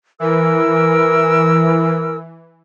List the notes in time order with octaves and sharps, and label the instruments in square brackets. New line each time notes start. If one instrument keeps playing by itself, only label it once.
[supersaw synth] E3 [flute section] A#4 E6